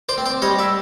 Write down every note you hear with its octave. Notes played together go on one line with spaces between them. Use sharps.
C5 D5
C4
C5 D5
G3 C#5 D#5
D5 E5